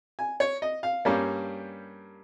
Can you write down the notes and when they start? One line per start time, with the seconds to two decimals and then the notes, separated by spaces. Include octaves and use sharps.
0.19 G#5
0.40 C#5
0.62 D#5
0.83 F5
1.05 G2 G3 A#3 C#4